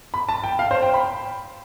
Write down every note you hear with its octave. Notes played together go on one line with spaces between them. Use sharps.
B5
A5
G5
F5
C5
G5
B5